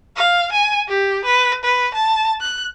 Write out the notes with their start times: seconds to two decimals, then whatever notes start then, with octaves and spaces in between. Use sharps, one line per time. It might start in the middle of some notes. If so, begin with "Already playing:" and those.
0.16 F5
0.52 G#5
0.88 G4
1.25 B4
1.64 B4
1.95 A5
2.41 F#6